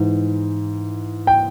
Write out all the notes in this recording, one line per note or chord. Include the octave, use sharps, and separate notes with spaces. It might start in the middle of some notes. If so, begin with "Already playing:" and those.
Already playing: G#2 E3
G5